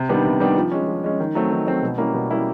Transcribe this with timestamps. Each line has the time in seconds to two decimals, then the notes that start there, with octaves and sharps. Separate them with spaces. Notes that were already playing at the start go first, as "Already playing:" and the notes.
Already playing: C3
0.09 D#3 G3 B3 D4
0.25 C3
0.40 D#3 G3 B3 D4
0.56 F3
0.71 G#3 C#4
0.88 F3
1.04 G#3 C#4
1.20 D#3
1.35 F#3 A3 C4
1.51 D#3
1.67 F#3 A3 C4
1.83 B2
1.98 G3 A#3 C#4 E4
2.14 B2
2.31 G3 A#3 C#4 E4